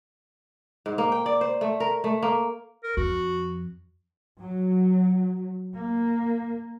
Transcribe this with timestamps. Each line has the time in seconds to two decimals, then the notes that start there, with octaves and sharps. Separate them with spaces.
0.86 G#2
0.98 A#3
1.12 G5
1.26 D5
1.41 C5
1.61 A3
1.80 A#4
2.04 A3
2.22 A#3
2.84 A#4
2.97 F2 F#4
4.42 F#3
5.75 A#3